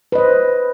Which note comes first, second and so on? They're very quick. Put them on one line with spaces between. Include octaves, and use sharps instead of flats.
B4 D#5 C5